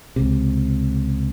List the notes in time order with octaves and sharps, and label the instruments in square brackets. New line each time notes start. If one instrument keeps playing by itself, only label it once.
[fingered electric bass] C#2 C3